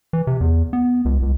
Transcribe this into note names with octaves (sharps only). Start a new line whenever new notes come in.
E3
C3
E2
B3
C#2
C#2